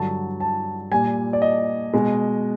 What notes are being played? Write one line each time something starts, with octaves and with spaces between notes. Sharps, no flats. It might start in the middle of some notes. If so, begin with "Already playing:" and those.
Already playing: G2 D3 F#3 A5
A5
A#2 G3 G#5
D5
D#5
B2 G#3